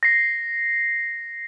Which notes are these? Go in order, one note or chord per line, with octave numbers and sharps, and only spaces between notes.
A#6 C7